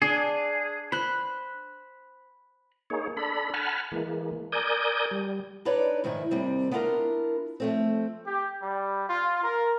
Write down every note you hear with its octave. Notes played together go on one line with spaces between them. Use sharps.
D4 G#4
C5 B5 F#6
A#3 D#4 G#4 C#5
D4 A4 B5
F#5 G#5 A5 B5 F6
E3 G#3 A#3
A#4 D5 G#5 D#6 G6
G3
D4 D#4 B4 C#5 D5
G#2 D#3 F3 E4
D#2 C3 G3 C4
B3 D4 E4 F4 G#4 A#4
F3 A3 C4
G4
G3
F4
A#4